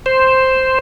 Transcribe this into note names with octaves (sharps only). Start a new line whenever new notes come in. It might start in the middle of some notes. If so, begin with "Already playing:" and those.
C5